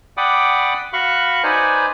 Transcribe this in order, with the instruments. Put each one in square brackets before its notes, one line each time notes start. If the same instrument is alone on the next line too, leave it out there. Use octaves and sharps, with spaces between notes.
[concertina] D5 F#5 G5 B5 D6 D#6
F#4 F5 B5 C#6 F#6
D#4 B4 C5 D5 G#5